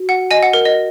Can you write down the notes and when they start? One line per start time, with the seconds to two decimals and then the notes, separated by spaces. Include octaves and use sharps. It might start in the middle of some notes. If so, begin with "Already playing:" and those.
Already playing: F#4
0.09 F#5
0.31 D#5 G#5
0.43 F#5
0.53 A#4
0.65 D#5